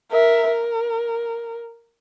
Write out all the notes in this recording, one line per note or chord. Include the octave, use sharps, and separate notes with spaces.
A#4 E5
A#4